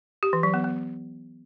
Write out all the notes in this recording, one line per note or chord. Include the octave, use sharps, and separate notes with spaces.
G4
E3
F#3
B3
B3